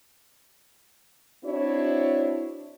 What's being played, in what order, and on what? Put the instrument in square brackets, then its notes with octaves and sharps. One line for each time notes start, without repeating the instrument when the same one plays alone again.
[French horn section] C4 D4 E4 F#4 C#5